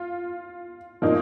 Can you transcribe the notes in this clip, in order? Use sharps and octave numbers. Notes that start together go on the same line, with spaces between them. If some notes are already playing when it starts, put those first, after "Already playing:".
Already playing: F4
A#2 F3 A#3 D#4